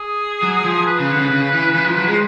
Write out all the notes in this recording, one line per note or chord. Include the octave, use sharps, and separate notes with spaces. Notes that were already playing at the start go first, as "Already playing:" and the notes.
Already playing: G#4
F#3
F3
B4
C#3
D3
C#3
C#3
E3
E3
F3
F#3
G#3
C5